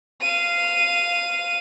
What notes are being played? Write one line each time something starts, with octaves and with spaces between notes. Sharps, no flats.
F5 D#7